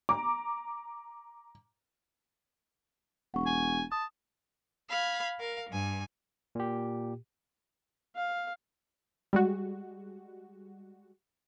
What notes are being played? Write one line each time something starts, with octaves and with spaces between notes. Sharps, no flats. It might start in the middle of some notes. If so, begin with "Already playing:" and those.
A#5 D6
E1 F#5 C#6
G#5
A5 D#6
F5 B5 G#6
A#4 F5
G2 G#5
A#2 G4
F5
G3 G#3 F#4